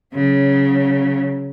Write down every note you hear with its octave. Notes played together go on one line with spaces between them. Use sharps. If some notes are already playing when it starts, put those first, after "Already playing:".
C#3 F#3